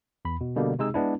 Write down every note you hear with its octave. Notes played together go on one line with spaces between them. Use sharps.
E2 B5
B2
B2 D3 G3 A#3
C3 G#3 D#4 G#4 E6
G#3 B3 D4 E4